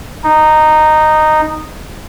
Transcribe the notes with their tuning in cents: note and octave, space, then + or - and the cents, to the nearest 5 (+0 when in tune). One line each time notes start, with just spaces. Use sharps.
D#4 -10